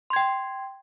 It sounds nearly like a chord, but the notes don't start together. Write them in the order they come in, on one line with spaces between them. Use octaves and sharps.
C6 G#6 G5